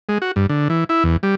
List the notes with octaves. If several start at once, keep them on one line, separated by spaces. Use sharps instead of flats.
G#3
F#4
G2
D3
E3
E4
E2
G3